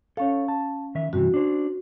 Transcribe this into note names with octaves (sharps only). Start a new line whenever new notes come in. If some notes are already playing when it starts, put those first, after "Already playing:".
C#4 A4 C#5 F5
A5
D#3 E5
G2 C3 E3 F#4
D4 C5